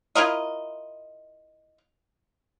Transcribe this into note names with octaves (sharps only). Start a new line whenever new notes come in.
E4 F4 A#4 D#5